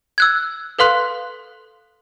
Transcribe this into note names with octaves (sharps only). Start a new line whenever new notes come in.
E6 F#6 G#6
A4 B4 F5 C6 F#6